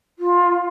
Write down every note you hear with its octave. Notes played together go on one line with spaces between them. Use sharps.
F4